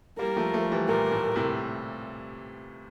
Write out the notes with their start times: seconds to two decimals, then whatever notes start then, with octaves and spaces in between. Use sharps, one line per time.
0.18 G3 A#3 A#4
0.36 F3 A3
0.54 F3 A3
0.71 E3 G3
0.89 A#2 A#4
1.12 A2
1.36 A2 C3